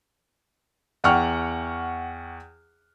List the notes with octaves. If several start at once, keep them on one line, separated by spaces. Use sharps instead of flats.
E2 F#5 G5 C#6 F6